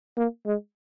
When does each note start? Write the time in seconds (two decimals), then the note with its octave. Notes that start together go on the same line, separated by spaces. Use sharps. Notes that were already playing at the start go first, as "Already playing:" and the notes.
0.17 A#3
0.46 G#3